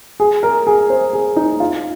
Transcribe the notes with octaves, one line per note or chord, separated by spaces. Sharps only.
G#4
A#4
G#4
C5
G#4
D#4
F4